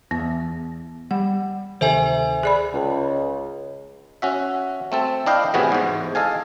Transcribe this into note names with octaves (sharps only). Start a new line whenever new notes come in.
E2 B3
G3 F#5
D2 C3 D#3 A4 C5 E5 G#5
G#4 D5 B5
C#2
C#4 F#4 E5
A3 C4 A4
D4 E4 D#5 F5 G5
A2 C3 E3 B3 F#4 G#4
E2 G#2
A4 D#5 F5 G#5